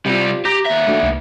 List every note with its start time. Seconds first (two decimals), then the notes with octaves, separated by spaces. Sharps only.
0.06 C3 G3 F4 G4
0.45 G4 A#5 G6 A#6
0.66 D#2 E5
0.87 A3 D4 F#4
1.03 C2